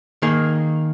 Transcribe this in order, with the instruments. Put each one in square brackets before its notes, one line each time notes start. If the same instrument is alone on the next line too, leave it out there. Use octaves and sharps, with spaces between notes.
[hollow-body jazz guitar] D#3 A#3 G#4